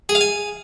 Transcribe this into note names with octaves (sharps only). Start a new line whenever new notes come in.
G#4
F5
G#5